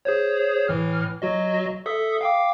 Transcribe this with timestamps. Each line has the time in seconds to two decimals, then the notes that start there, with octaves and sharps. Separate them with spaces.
0.05 G#4 C5 C#5
0.68 A2 E3 F6
1.22 F#3 F#4 D#5
1.86 A4 E5 D#6
2.21 F5 G5 D6